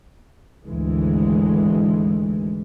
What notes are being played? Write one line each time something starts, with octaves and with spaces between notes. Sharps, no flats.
G#1 D2 E3 G#3